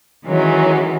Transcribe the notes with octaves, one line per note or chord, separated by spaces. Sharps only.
D#3 E3 F#3 G#3 C#4